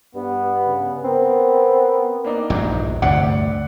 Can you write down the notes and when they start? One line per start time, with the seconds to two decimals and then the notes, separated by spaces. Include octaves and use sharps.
0.15 G2 B3
0.67 C#3
1.04 B3 C4 A#4
2.25 A#3 D4 D#4
2.50 A#1 E2 G2
3.02 D2 G2 C3 D5 F#5